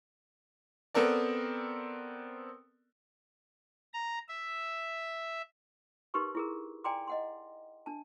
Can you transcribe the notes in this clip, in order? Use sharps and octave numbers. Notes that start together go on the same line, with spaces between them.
B3 C4 A4 A#4 D5
A#5
E5
D#4 G4 A#4 B4 C6 C#6
E4 G#4 A#4
D5 G5 G#5 A#5 C6 D6
D#5 F#5 C6
D4 A5